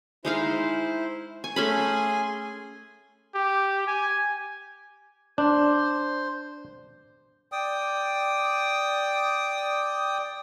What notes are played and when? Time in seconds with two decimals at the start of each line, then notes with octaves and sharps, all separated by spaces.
0.25 G#3 D#4 E4 C5 F5
1.44 G#5 C#6
1.56 A3 C#4 G#4 G#5 B5 C6
3.35 G4
3.87 G#5
5.38 D4 C5
7.52 D5 G5 D#6